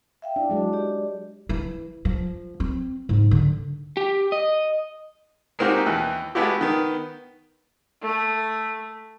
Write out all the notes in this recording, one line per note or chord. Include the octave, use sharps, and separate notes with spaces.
E5 F5 G5
D4 E4
F#3 G#3 D4
G4 D5
E3
F3
C4
G#2
D3
G4
D#5
G#3 A#3 C4 D#4 F#4 G4
D#2 E3
G#3 A3 B3 E4 F#4 G4
D#3 B3
A3